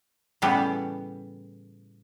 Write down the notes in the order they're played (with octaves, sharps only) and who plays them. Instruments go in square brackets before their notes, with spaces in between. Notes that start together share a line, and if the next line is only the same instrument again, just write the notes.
[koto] A2 C#3 E3 G3 B3